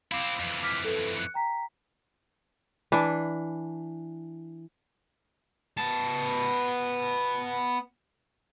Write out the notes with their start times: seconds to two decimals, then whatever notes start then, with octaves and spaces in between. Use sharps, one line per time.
0.12 C4 E4 F5 D6 F7
0.40 F2 E3
0.63 D6 F6 B6
0.85 A4 B4
1.16 F#6 C#7
1.34 G5 A#5 B6
2.92 E3 D4
5.77 B3 A5